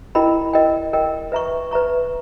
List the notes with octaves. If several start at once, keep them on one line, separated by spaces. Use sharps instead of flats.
E4 A#4 D#5 G5 B5
A#4 D#5 G5
A#4 D#5 G5
B4 E5 A#5 C#6
B4 E5 A#5 C#6